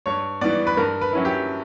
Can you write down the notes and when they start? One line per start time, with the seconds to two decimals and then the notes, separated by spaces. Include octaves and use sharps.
0.06 G2 C#5
0.41 E3 G3 B3 D5
0.67 B4
0.77 G2 A#4
1.01 B4
1.13 F#3 C#4 E4
1.25 G4